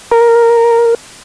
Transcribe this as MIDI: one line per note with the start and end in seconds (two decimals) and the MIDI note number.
0.11 0.94 70